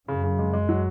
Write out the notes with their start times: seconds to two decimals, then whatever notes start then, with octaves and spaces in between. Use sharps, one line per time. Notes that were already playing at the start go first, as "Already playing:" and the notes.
0.08 F#2 C#3
0.23 C#3
0.39 G#3
0.53 G#3
0.69 F#3